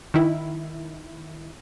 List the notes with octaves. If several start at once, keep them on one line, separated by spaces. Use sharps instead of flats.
D#3 E4